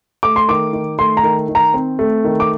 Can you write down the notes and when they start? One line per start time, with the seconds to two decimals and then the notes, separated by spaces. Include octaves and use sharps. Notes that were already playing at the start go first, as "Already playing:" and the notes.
0.23 A3 D6
0.36 C6
0.48 D#3 D6
0.73 D#3
0.98 A3 C6
1.17 A#5
1.23 D#3
1.49 D#3
1.55 A#5
1.74 C4
1.99 A3
2.24 D#3
2.40 D6